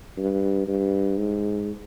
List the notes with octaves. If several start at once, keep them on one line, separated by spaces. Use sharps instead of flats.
G2
G2
G#2